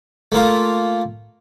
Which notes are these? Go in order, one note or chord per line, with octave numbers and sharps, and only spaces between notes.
A3 A#3 F4